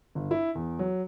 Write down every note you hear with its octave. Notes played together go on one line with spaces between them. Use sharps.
G1
E4
E2
F#3